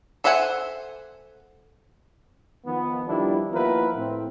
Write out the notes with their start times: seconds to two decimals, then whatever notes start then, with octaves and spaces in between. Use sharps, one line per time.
0.24 A4 C5 E5 F#5 G#5
2.66 D#3 F3 B3
3.06 D#3 F3 G3 B3 D4 E4
3.52 D#2 F3 B3 E4 A#4 B4
3.96 A2 C4